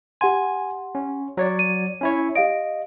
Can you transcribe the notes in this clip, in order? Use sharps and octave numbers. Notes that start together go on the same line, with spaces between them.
G4 F#5 G#5 C6
C#4
F#3 C#5 D5
D#7
C#4 E4 C#5
G4 D#5 F5 D7